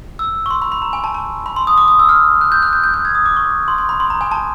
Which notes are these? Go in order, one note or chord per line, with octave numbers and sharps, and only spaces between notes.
E6
C#6
C6
B5
B5
A#5
G#5
A5
A5
B5
C6
D#6
D6
D#6
E6
F6
F#6
G6
F#6
G6
G6
G6
G#6
D#6
D6
C#6
C6
C6
B5
C6
A#5
G#5
A5